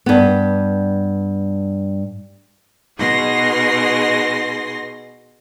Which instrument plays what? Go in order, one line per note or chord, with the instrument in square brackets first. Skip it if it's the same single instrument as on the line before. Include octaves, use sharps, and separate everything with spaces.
[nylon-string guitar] G2 B3
[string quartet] B2 D#4 G#4 C6 A#6